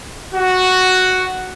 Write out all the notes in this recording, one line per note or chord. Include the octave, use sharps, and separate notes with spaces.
F#4